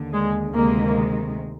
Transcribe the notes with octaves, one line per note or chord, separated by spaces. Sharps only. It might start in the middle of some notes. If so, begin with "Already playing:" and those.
Already playing: D#2 D3
G#3
D2 C3 D#3 G#3 A#3